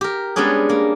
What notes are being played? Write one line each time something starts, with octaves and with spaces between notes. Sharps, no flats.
G4 A#4
G3 G#3 B3 C#4 D4 G#4
A#3